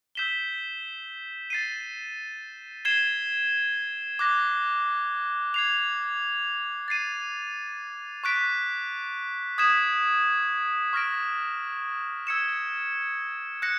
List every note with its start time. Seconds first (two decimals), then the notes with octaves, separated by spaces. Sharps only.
0.15 E6 G6 B6 E7 G7
1.50 A6 C7 D#7
2.85 G#6 C7 E7 G7
4.19 D6 F#6 A#6
5.54 G#6 C7 F7
6.88 A6 C7 D#7
8.24 C#6 F#6 B6 D7
9.58 D#6 G#6 B6 E7
10.93 C#6 F6 A#6 D7
12.27 E6 G#6 C#7 E7
13.62 F#6 A#6 C#7